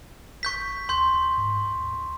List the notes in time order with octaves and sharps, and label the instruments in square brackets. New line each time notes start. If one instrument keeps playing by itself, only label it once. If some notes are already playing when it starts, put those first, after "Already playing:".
[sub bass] G#1 [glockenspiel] C#6 G6 B6
[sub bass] D2 [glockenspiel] C6 G6
[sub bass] G#2
D2